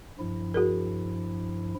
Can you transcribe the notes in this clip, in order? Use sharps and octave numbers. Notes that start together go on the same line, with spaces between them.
G2 F3 E4
F#4 G#4 A#4